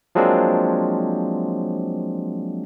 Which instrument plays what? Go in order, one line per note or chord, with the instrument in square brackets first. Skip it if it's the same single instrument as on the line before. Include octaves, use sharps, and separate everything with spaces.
[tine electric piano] F3 F#3 G#3 A#3 C4 D4